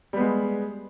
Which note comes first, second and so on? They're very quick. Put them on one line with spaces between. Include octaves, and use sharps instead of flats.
G3 B3 G#3